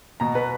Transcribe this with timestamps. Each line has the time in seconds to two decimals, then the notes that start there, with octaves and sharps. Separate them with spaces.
0.20 B2 A#5
0.35 B4